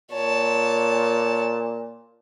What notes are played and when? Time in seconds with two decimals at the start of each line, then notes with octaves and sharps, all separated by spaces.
0.12 A#2 C#5 A5